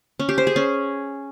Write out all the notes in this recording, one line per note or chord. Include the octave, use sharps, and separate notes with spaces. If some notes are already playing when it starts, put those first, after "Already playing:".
C#4
G4
C5
G#4
C#4